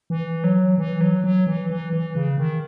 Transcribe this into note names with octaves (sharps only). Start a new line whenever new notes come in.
E3
F#3
E3
F#3
F#3
E3
E3
E3
C#3
D#3